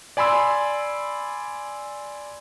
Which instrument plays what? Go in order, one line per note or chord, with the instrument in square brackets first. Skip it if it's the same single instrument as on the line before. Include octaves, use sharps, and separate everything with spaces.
[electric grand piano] D5 G#5 B5 C6 E6